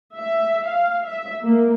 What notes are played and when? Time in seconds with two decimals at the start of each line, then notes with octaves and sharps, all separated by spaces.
0.15 E5
0.66 F5
1.06 E5
1.43 A#3